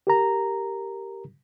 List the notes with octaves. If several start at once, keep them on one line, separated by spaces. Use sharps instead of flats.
G4 A#4 A#5